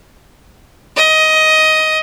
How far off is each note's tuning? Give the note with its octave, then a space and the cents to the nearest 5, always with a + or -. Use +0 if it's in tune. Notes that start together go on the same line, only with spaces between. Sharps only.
D#5 +15